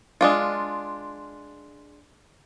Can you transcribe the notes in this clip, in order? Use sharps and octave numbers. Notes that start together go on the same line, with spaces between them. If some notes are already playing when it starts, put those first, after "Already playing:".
G#3 D4 F4